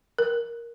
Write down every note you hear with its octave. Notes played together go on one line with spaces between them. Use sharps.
A#4